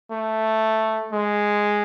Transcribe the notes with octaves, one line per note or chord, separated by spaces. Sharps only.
A3
G#3